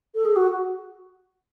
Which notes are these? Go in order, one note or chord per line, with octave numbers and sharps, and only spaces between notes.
A4
G#4
F#4